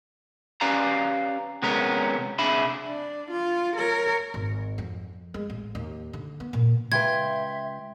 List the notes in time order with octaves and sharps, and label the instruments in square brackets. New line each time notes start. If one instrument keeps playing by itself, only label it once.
[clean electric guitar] C#4 G4 B4 D5 F5 A#5
C3 G#3 B3 C#4 A#4
C3 D4 G#4 E5 B5
[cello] D4
F4
A#4 C#5
[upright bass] G#1
F2
G#3
A1
D#2
D3
B3
A#2
[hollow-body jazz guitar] C#2 B4 [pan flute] E5 [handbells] G5 C6 G6 [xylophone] G#6